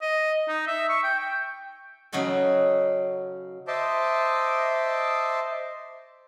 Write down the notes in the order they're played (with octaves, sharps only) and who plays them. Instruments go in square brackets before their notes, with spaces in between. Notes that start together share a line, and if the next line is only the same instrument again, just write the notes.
[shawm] D#5
D#4
E5
C#6
G5
G5
[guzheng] C#3 F#3 D#4 F#4 A4
[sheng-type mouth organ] C5 D#5 E5 A5 C6 D6